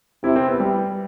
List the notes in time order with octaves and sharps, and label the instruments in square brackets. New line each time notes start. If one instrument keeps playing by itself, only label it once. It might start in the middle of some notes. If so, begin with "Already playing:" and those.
[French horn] C3 [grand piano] E4
[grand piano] C4
B3
G3